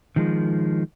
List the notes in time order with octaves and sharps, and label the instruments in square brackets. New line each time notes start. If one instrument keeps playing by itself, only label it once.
[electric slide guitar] D#3 F3 G#3